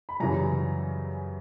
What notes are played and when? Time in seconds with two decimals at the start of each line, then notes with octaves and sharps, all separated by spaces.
0.09 B5
0.20 F#2 C#3 E3 G3 A#5